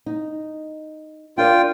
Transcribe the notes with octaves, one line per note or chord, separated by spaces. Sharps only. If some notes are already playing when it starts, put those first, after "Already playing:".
D#4
D4 F4 A#4 D5 G5